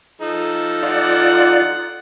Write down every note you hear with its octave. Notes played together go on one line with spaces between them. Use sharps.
F3 D#4 A4
F4 D5 F#5